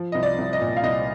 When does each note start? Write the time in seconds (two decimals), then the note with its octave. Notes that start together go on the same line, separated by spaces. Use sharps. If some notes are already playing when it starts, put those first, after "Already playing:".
Already playing: F3
0.12 C2 D#5
0.23 D5
0.38 C2
0.53 D#5
0.60 A#2
0.77 F5
0.83 C2 D#5